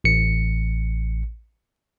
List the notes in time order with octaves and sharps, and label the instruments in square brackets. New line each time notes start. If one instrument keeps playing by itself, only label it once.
[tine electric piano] A1 C#7